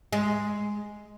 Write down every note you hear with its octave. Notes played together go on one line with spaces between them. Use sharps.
G#3